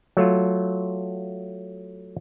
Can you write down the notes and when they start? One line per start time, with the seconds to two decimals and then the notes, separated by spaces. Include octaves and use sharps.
0.17 F#3 A3 F4